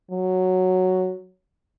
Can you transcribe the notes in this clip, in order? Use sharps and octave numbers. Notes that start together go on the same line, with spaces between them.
F#3